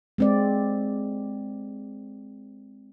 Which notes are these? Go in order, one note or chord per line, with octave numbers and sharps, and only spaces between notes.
G#3 C4 D5